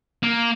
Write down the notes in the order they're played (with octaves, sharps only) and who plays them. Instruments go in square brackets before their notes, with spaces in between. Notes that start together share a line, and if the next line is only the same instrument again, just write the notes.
[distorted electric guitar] A#3